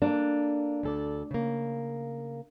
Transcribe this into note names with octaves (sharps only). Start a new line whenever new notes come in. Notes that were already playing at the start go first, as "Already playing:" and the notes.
A#3 D4 A4
D2 A4 D5
C#3 A#3